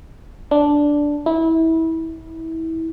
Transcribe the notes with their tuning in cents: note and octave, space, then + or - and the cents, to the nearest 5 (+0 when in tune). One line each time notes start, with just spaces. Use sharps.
D4 -5
E4 -25